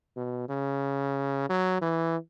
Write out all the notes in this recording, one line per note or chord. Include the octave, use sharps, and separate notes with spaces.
B2
C#3
F#3
E3